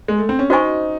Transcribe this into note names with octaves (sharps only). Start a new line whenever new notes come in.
G#3
A3
C4
C#4
D#4 F#4 C5 D#5 G#5 C#6